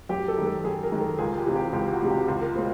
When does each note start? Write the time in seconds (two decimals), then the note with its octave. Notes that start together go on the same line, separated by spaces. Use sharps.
0.09 F#2 G4
0.28 A4
0.37 D#3 G#3
0.47 A4
0.64 F#2 G#4
0.83 A#4
0.92 D#3 G#3
1.01 A4
1.18 C#2 G#4
1.38 G4
1.46 C3 E3 G#3
1.56 G4
1.73 C#2 G4
1.92 F#4
2.01 C3 E3 G#3
2.10 G4
2.28 C#2
2.41 A#4
2.55 B2 G#3 C5